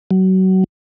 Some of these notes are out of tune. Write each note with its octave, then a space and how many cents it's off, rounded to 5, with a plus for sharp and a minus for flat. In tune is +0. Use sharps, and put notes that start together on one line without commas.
F#3 +25